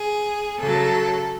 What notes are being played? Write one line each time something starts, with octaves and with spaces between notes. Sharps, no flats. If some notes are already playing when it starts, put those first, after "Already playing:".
Already playing: G#4
C#3 F#3 A4